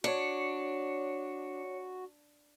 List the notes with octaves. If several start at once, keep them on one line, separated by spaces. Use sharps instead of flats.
D4 F#4 C#5 C#7